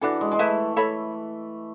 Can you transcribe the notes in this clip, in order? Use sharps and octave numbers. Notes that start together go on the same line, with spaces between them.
E3 D4 F#4 A4
G#3
G#3
A3 E4 B4 E5
A4 C#5 E5 B5